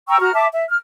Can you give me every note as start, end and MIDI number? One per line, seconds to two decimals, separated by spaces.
0.08 0.20 79
0.08 0.20 82
0.08 0.20 85
0.08 0.20 88
0.20 0.31 66
0.20 0.31 82
0.20 0.31 89
0.34 0.46 76
0.34 0.46 81
0.34 0.46 86
0.53 0.64 76
0.70 0.77 89